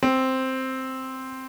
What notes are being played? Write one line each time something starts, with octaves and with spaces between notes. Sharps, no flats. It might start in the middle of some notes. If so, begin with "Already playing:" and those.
C4